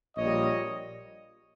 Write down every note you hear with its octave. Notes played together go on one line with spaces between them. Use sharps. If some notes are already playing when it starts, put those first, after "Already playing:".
A#1 A#2 G3 C#5 D#5